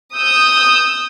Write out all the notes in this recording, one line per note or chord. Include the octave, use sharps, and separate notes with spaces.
D#6 E6 G6